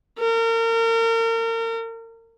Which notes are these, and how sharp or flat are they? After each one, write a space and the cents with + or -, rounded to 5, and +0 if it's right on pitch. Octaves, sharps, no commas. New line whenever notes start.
A#4 -35